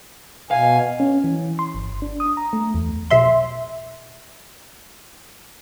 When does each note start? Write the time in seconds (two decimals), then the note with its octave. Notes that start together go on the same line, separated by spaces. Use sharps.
0.51 B2 F5 G#5
1.00 C#4
1.24 E3
1.59 C6
1.74 G1
2.02 D4
2.20 D#6
2.37 A#5
2.53 A3
2.75 E2
3.11 B1 E5 C6